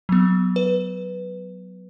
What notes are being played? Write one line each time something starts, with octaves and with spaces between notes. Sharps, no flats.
F#3 B3
B4